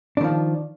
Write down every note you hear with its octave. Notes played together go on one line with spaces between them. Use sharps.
D#3 F3 D4